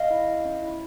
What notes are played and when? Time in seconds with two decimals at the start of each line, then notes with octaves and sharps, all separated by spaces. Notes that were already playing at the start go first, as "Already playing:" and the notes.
Already playing: D#5 F5
0.10 E4
0.28 E4
0.45 C#4
0.63 E4